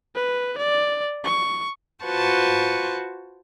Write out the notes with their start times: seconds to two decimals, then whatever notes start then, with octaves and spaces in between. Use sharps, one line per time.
0.15 B4
0.58 D5
1.25 C#6
2.03 F4 F#4 B4 C5 A5 C#6